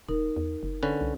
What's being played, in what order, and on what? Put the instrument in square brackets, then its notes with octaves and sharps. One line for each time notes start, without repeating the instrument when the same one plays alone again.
[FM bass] D#1 [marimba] D#4 A#4
[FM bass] E2
F#1
[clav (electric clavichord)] D3 C#4 B4
[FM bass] C2